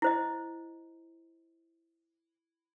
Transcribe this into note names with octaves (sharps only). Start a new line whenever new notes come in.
E4 C5 D#5